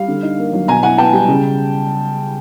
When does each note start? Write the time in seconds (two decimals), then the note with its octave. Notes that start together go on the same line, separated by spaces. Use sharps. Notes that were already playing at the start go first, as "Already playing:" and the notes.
Already playing: G3 F5
0.08 D3
0.23 D#4
0.38 A#3
0.53 F#3
0.68 B2 G#5 A#5
0.83 E4 F#5 G#5
0.98 B3 G5 A5
1.13 G3
1.28 C#3